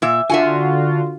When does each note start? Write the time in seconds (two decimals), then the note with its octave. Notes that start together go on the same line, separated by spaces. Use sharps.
0.02 A#2 E5
0.30 D3 F4 F#4 E5 F#5 G#5